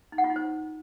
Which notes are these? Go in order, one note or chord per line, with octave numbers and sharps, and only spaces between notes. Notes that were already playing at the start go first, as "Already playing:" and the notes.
D#4
F#5
F4
D#4
C5